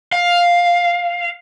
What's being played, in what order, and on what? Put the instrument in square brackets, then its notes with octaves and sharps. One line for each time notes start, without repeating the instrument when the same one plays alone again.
[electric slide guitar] F5